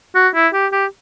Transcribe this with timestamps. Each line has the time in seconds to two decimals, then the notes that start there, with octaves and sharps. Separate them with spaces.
0.15 F#4
0.35 E4
0.53 G4
0.72 G4